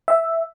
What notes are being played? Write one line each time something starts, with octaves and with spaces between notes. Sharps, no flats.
E5